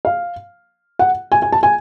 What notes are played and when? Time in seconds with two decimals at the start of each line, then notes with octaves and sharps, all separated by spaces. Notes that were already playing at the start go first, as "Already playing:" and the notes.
0.05 F5
0.99 F#5
1.32 G#5
1.42 G#5
1.52 A5
1.63 G#5